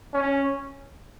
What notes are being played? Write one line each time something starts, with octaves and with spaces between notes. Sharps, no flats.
C#4